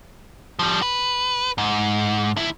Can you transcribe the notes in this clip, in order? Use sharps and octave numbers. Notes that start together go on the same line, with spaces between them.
F3 G3
B4
G#2
D2 E4